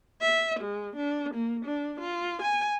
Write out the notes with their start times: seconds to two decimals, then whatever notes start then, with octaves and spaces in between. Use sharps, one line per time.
0.21 E5
0.60 G#3
0.96 D4
1.35 A#3
1.65 D4
2.00 F4
2.42 G#5